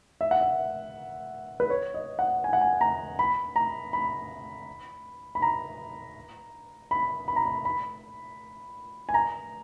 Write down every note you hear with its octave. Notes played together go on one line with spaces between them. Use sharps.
E5
F#5
E5
B4
C#5
D#5
F#5
G#5
F#5
G#5
A#5
B5
A#5
B5
B5
A#5
B5
B5
A#5
B5
B5
G#5
A#5